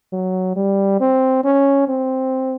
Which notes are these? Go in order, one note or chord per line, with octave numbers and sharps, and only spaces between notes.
F#3
G3
C4
C#4
C4